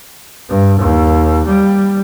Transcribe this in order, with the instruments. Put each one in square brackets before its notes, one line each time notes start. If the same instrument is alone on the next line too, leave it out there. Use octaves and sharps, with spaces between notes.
[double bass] G2
D#2
G3